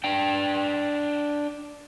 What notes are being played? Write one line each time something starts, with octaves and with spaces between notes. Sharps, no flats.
D4 G5